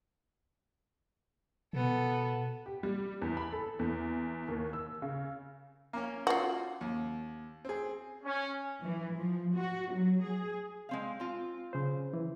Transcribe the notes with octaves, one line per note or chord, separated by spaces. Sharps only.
B2 B3 A4
G4
G3
E2
B5
A4
E2
D#2
E6
C#3
A#3 C#4
F4 F#4
D#2
C4 G#4
C#4
E3
F3
F#4
F#3
G#4
G#3 C4 F5
C4 F4
C#3 C5
E3